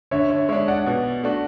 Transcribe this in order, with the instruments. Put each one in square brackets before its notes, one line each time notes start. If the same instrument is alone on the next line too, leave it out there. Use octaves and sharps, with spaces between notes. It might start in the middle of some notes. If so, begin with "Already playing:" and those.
[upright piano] D3 [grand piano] C#5 E5
[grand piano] C#5 E5
[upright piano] G#3 D4 [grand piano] C#5 E5
[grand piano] D5 F#5
[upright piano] B2
A3 D4 F#4